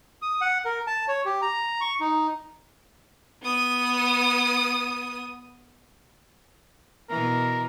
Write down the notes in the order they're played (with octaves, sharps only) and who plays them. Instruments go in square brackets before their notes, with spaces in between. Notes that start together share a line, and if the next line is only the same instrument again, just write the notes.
[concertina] D#6
F#5
A#4
A5
C#5
G4
A#5
C#6
D#4
[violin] B3 D#6
[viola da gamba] B2 E3 [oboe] A#4